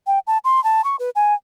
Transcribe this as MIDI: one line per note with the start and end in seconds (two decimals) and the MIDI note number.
0.07 0.19 79
0.27 0.38 81
0.44 0.62 84
0.64 0.84 81
0.84 0.96 85
0.99 1.10 71
1.15 1.34 80